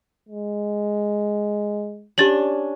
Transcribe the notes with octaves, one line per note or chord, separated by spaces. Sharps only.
G#3
C#4 D4 G4 A6 F#7